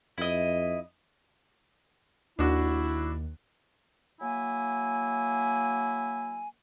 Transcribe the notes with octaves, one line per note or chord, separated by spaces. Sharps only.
F2 E4 D#5
D#2 D4 E4 F#4
F#3 A#3 E4 G#5